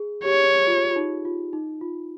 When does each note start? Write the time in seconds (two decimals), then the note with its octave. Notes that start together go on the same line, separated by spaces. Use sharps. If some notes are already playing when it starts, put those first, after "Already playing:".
Already playing: G#4
0.25 G4 C#5
0.67 F4
0.91 F4
0.96 D#4
1.25 F4
1.53 D#4
1.81 F4